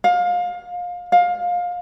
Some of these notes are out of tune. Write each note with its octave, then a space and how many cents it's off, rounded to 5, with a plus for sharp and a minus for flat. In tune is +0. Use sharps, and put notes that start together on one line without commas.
F5 +25
F5 +20